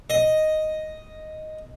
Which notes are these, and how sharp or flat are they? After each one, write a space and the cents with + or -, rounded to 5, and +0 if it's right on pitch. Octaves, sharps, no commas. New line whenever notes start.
D#5 +0